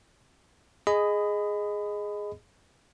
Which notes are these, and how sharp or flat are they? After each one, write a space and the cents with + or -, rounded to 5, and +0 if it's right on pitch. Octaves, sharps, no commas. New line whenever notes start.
G#4 +0 D#5 -5 B5 +25